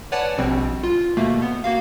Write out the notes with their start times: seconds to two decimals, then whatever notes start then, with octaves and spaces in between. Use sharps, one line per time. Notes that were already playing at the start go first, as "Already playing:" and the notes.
0.12 B4 C#5 D5 F#5 G#5 A5
0.38 A#1 B2 G3 C4
0.83 F4
1.17 D#2 B2 A3 A#3
1.42 B3
1.64 A#3 F#4 F5